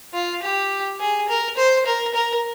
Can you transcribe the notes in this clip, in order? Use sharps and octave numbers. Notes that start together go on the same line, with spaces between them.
F4
G4
G#4
A#4
C5
A#4
A#4